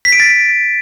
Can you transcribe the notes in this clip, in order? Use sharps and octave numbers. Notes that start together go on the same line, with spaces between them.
B6
D7
A6